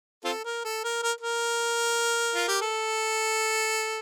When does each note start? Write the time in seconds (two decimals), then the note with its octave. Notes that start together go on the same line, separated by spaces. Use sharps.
0.24 C4 F4 A4
0.44 A#4
0.65 A4
0.84 A#4
1.03 A#4
1.21 A#4
2.35 F4
2.48 G4
2.61 A4